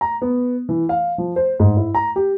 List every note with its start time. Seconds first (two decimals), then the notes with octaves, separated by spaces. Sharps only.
0.01 A#5
0.22 B3
0.69 E3
0.89 F5
1.18 F3
1.36 C5
1.60 G#2
1.77 E4
1.95 A#5
2.16 G4